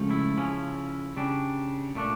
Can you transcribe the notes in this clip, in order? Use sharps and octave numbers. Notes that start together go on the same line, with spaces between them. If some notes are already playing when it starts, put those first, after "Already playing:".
Already playing: C#2 C#3 F3 A3
E4
C#3 F3 C#4
C#3 G3 D4
A#2 A3 D4